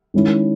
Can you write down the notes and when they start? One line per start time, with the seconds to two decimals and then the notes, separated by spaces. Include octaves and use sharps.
0.14 D#3 G#3 C#4 E4